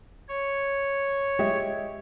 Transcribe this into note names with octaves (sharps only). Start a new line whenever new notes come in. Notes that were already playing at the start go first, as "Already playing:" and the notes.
C#5
G#3 G4 E5